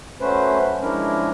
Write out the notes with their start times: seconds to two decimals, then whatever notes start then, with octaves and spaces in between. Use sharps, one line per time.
0.21 F#3 A3 C#4 B4 C5
0.82 F3 G#3 C#4 D4 E4 A#4